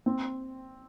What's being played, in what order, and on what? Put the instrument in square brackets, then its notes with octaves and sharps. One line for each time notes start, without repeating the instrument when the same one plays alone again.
[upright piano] C4